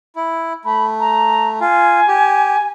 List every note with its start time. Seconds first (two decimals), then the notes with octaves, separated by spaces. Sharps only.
0.16 E4
0.65 A3 B5
1.00 A#5
1.61 F4 G#5
2.08 G4